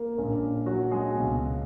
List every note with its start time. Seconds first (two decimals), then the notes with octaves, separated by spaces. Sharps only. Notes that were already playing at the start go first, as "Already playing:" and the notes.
Already playing: A#3 A#4
0.18 A#1 A#2 G#3 C#4
0.66 F#3 F#4
0.91 G#3 G#4
1.16 C#2 B2 F#3 C#4